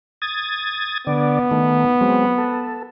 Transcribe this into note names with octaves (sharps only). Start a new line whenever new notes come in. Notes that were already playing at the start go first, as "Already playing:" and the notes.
D#6 G#6 A6
D3 B3 D5
D#3 A3
F#3 G#3 C4
A4